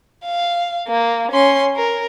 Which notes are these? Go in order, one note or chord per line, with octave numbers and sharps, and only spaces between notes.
F5
A#3
C#4 C6
A#4